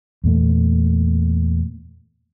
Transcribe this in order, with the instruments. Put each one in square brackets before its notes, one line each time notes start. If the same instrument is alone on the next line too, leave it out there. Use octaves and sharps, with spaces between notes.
[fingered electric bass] E2 A#2 A3